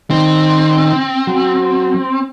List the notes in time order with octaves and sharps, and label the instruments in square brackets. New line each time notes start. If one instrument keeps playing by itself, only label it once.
[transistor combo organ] D#3 [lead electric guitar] C4
[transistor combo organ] F#3